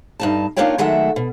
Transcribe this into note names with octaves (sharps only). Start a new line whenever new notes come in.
G2 D#4 A5
A#3 D4 D#4 F4 C#5 G5
D#3 F#3 G#3 A3 E5 F#5
B2